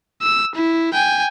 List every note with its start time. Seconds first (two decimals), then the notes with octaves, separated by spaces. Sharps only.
0.22 E6
0.55 E4
0.94 G5 G#5